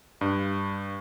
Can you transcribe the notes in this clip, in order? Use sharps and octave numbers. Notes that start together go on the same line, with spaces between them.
G2